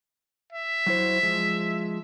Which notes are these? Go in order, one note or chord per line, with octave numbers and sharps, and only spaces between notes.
E5
F#3 E4 C5
F3 G#3